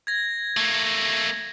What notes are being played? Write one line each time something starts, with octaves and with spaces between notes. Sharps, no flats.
G#6 A#6
A3 A#3